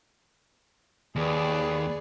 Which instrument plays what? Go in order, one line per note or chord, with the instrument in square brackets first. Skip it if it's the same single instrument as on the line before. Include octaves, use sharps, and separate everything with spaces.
[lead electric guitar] D#2 [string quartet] G#4 B4 D5